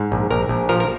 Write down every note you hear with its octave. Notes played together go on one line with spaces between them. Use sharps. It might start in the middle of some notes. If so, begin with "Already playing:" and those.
Already playing: G#2
A#1
A#1 A#4
A#1
F3 A#4
A#4